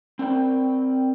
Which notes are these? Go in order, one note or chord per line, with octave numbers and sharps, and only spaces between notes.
C4 A#4 D5 G5